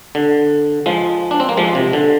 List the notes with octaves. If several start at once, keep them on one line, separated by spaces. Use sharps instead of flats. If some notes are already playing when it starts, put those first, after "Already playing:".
D3
F3 G#3
D4
C4
A#3
F3 G#3
C3
D3